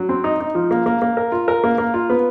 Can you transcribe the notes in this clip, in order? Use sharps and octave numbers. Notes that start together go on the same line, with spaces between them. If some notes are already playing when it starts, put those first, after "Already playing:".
Already playing: F#3
C4
D#4
D#4
F3
A#3
A#3
A#3
A#4
F4
A#4
A#3
A#3
F4
B3